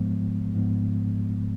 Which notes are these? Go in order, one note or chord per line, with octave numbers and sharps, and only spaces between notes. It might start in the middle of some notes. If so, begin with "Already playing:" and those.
Already playing: G#2 F3 G#3 B3
G#2 F3 G#3 B3